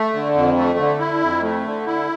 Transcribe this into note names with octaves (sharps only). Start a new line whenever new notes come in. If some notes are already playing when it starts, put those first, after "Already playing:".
Already playing: A3
D3
F2
A3
D3
E4
F2
A3
D3
E4